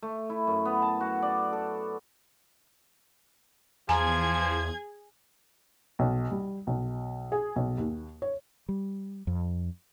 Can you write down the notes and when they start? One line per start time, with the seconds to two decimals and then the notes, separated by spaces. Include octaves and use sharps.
0.03 A3
0.30 E4
0.47 F#2
0.65 B3
0.82 A5
1.00 F#4
1.22 D5
1.53 A4
3.89 E2 F3 G#4 G#5 A#5 G#6
5.99 B1
6.31 G3
6.67 B1
7.32 G#4
7.56 B1
7.78 D#2
8.22 C#5
8.69 G3
9.27 F2